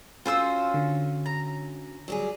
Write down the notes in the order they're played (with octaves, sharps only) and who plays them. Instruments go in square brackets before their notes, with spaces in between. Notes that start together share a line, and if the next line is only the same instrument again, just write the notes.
[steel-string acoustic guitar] C#4 F#4 [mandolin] F4 C5 E6
[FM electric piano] D3
[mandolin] A#5
[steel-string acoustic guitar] F#3 G3 G#4